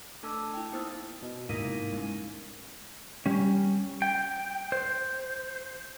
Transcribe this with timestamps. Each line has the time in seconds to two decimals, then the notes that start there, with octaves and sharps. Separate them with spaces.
0.23 A3 D4 A4 A5 D6 E6
0.54 E4 G5
0.71 A#3 B3 D#4 C5 D#6 F6
1.22 B2
1.49 G#2 C3 A#3 D#4 E4 D#7
1.93 G#3 C#4
3.26 G3 C#4
4.02 G5
4.72 C5